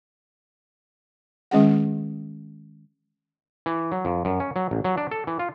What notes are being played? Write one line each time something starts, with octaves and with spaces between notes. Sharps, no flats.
D#3 G#3 C#4 G#4 F#5
E3
F#3
F2
F#2
C#4
F#3
A1
F#3
D4
A4
E3
F4